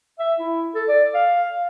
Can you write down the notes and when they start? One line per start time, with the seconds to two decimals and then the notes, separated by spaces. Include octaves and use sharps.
0.19 E5
0.39 E4
0.75 A4
0.89 D5
1.15 F5